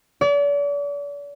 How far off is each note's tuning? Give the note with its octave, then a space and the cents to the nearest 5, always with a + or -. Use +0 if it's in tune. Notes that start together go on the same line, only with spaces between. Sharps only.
D5 -40